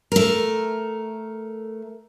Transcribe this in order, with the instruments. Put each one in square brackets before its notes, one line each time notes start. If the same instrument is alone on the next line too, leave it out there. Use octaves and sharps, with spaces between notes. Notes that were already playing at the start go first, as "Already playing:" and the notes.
[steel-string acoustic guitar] A3 A#4